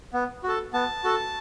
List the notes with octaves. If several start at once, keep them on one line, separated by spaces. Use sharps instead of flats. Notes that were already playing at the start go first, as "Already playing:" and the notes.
B3
F#4 A4
B3 A5
F#4 A4